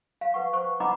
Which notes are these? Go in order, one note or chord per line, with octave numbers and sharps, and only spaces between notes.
F5
B4 F#5 C#6
C5 C#6
D#4 D#5 F#5 A#5 B5 D6